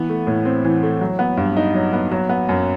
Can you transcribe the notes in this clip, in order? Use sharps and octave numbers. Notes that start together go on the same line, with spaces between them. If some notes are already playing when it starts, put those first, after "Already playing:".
Already playing: E3 B3
A3
A2
C4
E3
A3
F#3
B3
G2
D#4
F#3
B3
F#3
B3
F#2